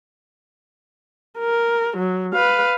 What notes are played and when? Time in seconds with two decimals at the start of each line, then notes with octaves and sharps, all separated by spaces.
1.39 A#4
1.97 F#3
2.34 B4 F5